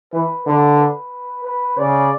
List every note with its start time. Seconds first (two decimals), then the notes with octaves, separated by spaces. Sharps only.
0.13 E3 B4
0.46 D3 B4
0.79 B4
1.45 B4
1.78 C#3 D5